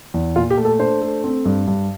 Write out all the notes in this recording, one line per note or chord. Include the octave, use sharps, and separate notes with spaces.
E2
A#2 F4
G4
A3
A4
D4 C5
A3
C4
G2
G2